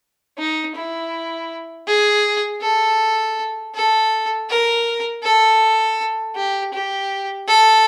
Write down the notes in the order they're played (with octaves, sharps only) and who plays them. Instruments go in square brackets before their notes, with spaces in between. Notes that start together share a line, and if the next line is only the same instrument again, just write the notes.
[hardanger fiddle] D#4
E4
G#4
A4
A4
A#4
A4
G4
G4
A4